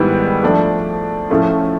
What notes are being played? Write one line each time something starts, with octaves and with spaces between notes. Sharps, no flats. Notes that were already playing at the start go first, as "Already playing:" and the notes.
Already playing: G#2 D#3 G3 B3 E4
F3 A3 D4
A2 F3 A3 C#4 F4